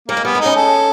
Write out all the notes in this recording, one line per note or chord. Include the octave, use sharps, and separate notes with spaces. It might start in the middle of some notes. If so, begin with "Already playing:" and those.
G3 A#3
G#3
G3 B3
G#3 D#4
C#4
A4